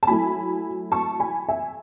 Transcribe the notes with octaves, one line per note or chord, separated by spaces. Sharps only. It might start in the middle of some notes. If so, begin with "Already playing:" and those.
A5
F#3 A3 E4 G#5 B5
A5 C#6
G#5 B5
E5 G#5